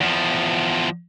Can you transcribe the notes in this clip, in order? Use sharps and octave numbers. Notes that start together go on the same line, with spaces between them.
E2 F3